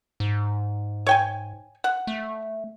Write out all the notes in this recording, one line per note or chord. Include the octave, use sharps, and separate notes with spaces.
G#2
C#5 G5 G#5
F#5
A3